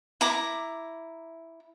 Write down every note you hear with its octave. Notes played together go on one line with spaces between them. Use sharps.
E4 A#5 D6